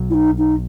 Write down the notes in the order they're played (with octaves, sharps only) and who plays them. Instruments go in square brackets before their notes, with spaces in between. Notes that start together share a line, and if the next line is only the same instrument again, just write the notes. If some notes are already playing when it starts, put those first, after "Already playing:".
Already playing: [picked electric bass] B1 B2 F#3
[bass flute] E4
D#4
D#4